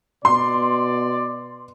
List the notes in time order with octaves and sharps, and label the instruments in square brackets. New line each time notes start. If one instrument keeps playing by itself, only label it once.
[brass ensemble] B2 D5 [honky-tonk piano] C6